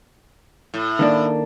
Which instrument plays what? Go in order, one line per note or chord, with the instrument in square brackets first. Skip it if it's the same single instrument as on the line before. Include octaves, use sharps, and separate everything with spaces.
[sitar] A2
[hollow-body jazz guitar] D#3 A#3 D4